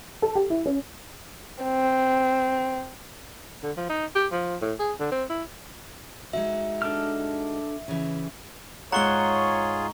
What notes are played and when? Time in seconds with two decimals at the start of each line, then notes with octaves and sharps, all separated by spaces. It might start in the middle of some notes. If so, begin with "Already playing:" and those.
0.22 A4
0.35 G4
0.50 E4
0.66 C#4
1.64 C4
3.63 D3
3.77 F3
3.90 D#4
4.15 G4
4.32 F3
4.62 A2
4.79 G#4
4.99 D3
5.12 C4
5.30 E4
6.33 G#3 D#4 F#4 E5
6.82 D4 A4 F6
7.88 C#3 E3
8.92 G#2 F4 G#4 C#5 F#5 A#5 C#6 G7